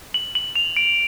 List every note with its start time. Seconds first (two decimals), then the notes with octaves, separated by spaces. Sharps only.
0.14 F#7
0.35 F#7
0.56 F7
0.76 D7